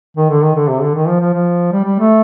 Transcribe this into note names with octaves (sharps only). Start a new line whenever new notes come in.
D#3
D3
D#3
D3
C3
D3
D#3
F3
F3
F3
G3
G3
A3